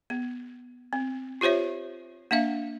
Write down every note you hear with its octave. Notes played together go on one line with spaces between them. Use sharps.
B3
C4
F4 G4 C5 C#5 E5
A#3 D4 E5 F5